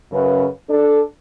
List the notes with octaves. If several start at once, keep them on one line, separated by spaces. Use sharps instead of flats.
F#2 C#3 B4
D4 A4